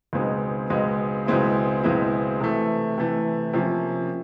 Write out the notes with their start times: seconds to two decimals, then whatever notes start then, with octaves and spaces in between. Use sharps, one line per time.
0.13 C#2 B2 G#3 C4 D#4
0.70 C#2 B2 G#3 C4 D#4
1.27 C#2 B2 G#3 C4 E4
1.83 C#2 B2 G#3 C4 E4
2.40 C3 E3 A3
2.98 C3 E3 A3
3.53 C3 F3 A#3 C#4